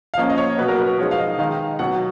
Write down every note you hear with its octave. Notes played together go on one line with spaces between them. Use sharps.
F5
F3 A#3 C#4 D#5
D#5
C#5
B2 F#3 B3 B4
A#4
B4
F3 G#3 B3 D#4 C#5
F5
D#5
D#3 G#3 D#4 F5
B2 F#3 B3 F#5